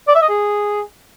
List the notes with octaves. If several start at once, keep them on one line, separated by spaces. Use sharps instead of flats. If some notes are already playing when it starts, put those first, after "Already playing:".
D5
E5
D#5
G#4